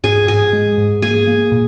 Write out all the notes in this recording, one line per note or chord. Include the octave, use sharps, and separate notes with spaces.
G#2 G#4 G#5
G#2 G#4 G#5
G#3
G#2
A#3 G#4 G#5
A#3
A#2